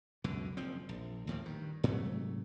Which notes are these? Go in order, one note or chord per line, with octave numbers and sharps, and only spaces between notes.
C#2 F#2 B2 D3
F#1 F3 C4
A#1
D2 A2 F3 A#3
G2 D#3
G#2 C3 F#3 A3